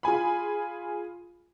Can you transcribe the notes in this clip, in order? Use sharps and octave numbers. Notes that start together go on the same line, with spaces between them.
F4 G#4 G#5 B5